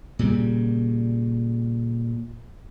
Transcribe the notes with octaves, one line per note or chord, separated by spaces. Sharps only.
A#2 C#3 G3